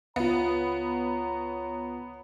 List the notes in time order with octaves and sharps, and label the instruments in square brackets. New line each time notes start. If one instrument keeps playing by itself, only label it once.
[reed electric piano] C#2 F4 [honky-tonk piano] B3 [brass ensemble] C#5 A#5